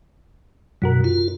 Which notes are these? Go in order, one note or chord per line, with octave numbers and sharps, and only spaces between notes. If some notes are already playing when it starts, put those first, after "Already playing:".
F#2 B2 F#4 A#4
F4